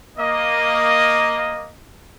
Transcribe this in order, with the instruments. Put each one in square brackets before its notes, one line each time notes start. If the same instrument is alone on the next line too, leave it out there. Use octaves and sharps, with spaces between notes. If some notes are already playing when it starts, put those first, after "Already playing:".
[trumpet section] A#3 D#5